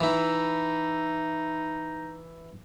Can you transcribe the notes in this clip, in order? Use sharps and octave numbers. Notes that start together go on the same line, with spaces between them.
E3 D#4 E4